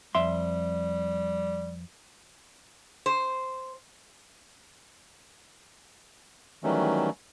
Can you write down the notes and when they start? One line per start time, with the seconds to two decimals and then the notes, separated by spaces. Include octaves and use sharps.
0.15 F2 G3 E5 C6
3.06 C5
6.64 D#3 E3 F#3 G3 A3 C#4